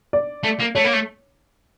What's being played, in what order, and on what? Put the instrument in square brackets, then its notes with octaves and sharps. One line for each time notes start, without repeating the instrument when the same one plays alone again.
[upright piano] D5
[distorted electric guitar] A3
A#3
[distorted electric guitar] A3 [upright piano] C#5
[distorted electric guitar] A#3
A3